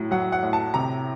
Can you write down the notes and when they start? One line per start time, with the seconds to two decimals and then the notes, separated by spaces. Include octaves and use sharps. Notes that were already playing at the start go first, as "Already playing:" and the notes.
Already playing: A2 F#3
0.11 F#3 F#5
0.32 F#5
0.43 A2
0.53 A5
0.74 C3 A#5